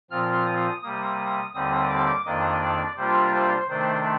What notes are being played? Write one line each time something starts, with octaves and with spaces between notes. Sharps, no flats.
A#2 F3 C4 F4 F6
D#6
C3 G3 A#3 D#6
D#2 D3 G3 C4 D#6
D6
F2 D#3 A#3 D4 D#5
D5
C3 G3 A#3 D4 F4 C5
C5
C3 D#3 A3 D4 C5